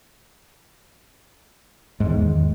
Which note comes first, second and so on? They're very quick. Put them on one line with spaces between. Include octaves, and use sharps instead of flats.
G#2 E2 D#3